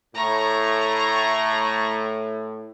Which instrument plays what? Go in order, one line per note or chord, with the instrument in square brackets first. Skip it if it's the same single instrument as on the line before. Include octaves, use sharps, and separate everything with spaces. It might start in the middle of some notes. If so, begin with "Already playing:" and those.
[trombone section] A2 [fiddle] A#5 C#6